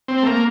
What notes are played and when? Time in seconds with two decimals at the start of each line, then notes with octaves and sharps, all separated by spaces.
0.08 C4
0.23 A3
0.26 A#3